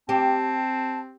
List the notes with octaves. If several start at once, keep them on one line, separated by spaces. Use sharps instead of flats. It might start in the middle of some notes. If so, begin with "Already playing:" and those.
C4 G4 A5